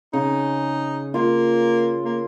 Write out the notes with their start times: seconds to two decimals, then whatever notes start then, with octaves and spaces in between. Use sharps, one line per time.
0.13 C#3 D#4
1.14 A#3 F4
2.05 A#3